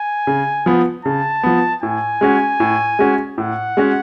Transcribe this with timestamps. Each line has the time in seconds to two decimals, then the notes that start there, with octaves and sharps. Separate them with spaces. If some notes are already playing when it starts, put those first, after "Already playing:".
Already playing: G#5
0.27 C#3
0.66 F3 B3
1.05 C#3 A5
1.43 F3 B3
1.83 A2 G#5
2.21 G#3 C#4 F#4
2.60 A2
2.99 G#3 C#4 F#4
3.38 A2 F#5
3.77 G#3 C#4 F#4